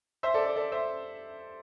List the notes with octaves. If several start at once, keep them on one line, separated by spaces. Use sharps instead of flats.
C5 E5
A4 D5
A4 D5
A4 D5
C5 E5